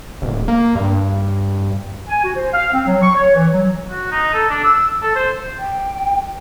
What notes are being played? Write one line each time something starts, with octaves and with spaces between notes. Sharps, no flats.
D1
A#3
G2
G#5
F#4
C5
F5
C4
F#3
C#6
C#5
E3
F#3
F#4
D#4
A4
D4
E6
A4
C5
G5